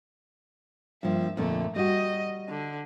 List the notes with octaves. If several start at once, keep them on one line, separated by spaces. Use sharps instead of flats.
G2 F3 A#3 E5
F2 A#2 D3 A3
G3 F#4 D#5
D3